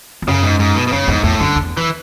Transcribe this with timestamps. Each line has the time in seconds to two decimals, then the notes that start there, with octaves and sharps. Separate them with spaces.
0.22 E2
0.27 F#2 C#3
0.43 G#2
0.59 G#2
0.76 B2
0.87 B2
0.92 F#2 C#3
1.08 E2 G#2
1.23 E2 A2
1.39 F#2 D3
1.56 E2
1.77 E3